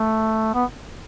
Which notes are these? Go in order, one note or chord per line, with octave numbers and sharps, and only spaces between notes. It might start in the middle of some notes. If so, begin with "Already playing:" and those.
Already playing: A3
B3